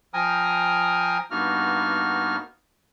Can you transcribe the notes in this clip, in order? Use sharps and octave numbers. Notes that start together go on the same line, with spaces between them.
F3 G5 G#5 A#5 D#6 F6
G2 A#3 B3 D#4 F#4 F6